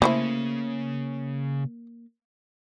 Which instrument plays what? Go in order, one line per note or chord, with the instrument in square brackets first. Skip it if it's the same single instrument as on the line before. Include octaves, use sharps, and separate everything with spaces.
[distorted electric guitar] C#3 [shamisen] A3 E4 C5 [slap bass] A#3